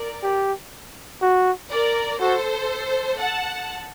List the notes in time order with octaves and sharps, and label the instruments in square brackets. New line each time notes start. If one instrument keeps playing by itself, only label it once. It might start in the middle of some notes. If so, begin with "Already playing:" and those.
Already playing: [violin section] A#4 D5
[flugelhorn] G4
F#4
[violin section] A#4 D5
[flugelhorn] F#4 [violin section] A4 C5
[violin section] F#5 A5